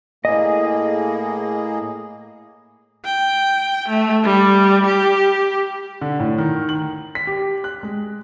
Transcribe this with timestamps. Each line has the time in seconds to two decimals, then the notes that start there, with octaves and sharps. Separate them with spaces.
0.25 A2 A#3 G#4 D#5
3.05 G5
3.89 A3
4.24 G3
4.86 G4
6.01 D3
6.20 A2
6.38 D#3
6.69 F#7
7.15 B6
7.27 G4
7.64 F#6
7.83 G#3